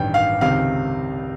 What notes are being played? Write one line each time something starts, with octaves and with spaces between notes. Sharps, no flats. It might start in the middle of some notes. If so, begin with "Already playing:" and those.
Already playing: A1 G2 D#3 G5
F5
C#2 C3 D#3 F5